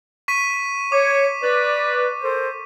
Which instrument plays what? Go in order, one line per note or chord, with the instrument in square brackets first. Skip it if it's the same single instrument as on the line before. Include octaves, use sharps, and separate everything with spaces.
[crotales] C#6 B6 D#7
[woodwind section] C#5 [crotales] D6
[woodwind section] B4 D5
A4 A#4 C5